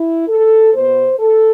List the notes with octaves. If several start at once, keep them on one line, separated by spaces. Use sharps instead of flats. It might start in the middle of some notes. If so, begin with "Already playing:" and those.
Already playing: E4
A4
B2 B3 C5
A4